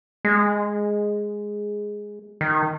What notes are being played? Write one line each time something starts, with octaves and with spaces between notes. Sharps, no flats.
G#3
D#3